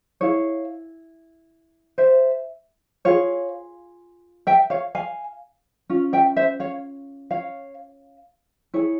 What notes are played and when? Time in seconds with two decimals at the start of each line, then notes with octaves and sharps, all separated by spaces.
0.21 E4 G#4 C#5 F5
1.98 C5 E5
3.05 F4 G#4 C#5 F5
4.47 E5 G5
4.70 C#5 F5
4.95 F5 G#5
5.90 C#4 F4
6.13 E5 G5
6.36 C5 E5
6.60 C#5 F5
7.31 C#5 F5
8.74 E4 G#4 C#5